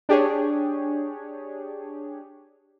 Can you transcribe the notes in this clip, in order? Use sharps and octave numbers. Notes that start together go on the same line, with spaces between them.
D4 G4 G#4 C#5